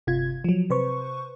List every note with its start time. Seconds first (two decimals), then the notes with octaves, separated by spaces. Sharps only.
0.07 G1 C3 F4 G#6
0.44 F3 F#3
0.70 C3 B4 C5 C#6